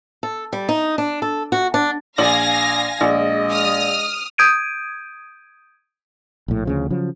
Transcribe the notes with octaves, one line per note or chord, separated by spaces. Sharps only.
A4
G3
D#4
D4
A4
F#4
D4
A#1 D5 F5 G#5 A#6 F#7
A#1 G#3 D#5
D#6 F6
D#6 G6 G#6 D7 D#7
A#1 A2
D2 C#3 F3
C#3 F3 F#3